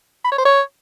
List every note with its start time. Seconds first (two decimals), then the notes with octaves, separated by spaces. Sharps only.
0.25 B5
0.32 C#5
0.38 C5
0.45 C#5